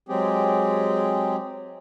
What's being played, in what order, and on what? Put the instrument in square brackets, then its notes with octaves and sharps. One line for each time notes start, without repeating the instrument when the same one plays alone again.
[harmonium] F#3 G#3 C4 G4 G#4